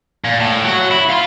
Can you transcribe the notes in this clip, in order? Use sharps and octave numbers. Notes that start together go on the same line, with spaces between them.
A#2
A2
F#3 F#4
E4
F5 C6